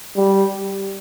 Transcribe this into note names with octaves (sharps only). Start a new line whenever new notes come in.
G3